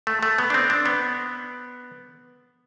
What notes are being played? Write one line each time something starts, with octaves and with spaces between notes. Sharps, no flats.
A3
A3
B3
D4
C4
D4
B3